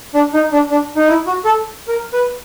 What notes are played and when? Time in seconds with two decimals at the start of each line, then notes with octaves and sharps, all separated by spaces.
0.14 D4
0.34 D#4
0.52 D4
0.70 D4
0.96 D#4
1.08 E4
1.27 F#4
1.45 A4
1.88 A#4
2.13 B4